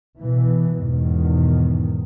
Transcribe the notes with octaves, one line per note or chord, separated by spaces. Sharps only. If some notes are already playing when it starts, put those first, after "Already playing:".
B2 E3
E2 G#2 B2 D#3